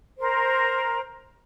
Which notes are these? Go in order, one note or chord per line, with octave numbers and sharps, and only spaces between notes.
A#4 C5